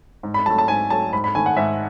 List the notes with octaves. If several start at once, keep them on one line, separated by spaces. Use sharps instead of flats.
G#2
B5
F#3 A3 A5
A5
G#2 G#5
F#3 A3 A5
G#2 B5
B5
D#3 A3 G#5
F#5
G#2 E5